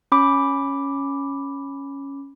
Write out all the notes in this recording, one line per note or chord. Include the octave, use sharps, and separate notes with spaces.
C#4 B5 D6